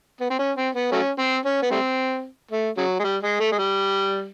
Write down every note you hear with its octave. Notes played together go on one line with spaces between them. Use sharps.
B3
C4
C#4
C4
B3
F#3 A3 C#4
C4
C#4
B3
G3 A3 C4
A3
C#3 F#3
G#3
G3
G#3
A3
G#3
G3